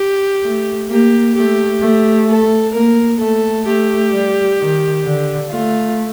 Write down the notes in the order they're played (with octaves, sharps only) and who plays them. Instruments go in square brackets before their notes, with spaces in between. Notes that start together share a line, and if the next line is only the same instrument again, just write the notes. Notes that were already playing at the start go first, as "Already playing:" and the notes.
Already playing: [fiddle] G4
[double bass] A3
[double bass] A#3 [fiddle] G4
[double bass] A3 [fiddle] G4
[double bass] A3
[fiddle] A4
[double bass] A#3 [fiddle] A#4
[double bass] A3 [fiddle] A4
[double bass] A3 [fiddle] G4
[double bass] G3
D#3
D3
[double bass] A3 [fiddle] F4